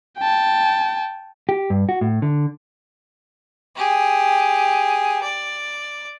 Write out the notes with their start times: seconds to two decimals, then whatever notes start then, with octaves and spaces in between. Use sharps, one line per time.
0.18 G5 A5
1.49 G4
1.70 G2
1.89 F#4
2.01 A2
2.22 D3
3.76 G4 G#4
5.23 D5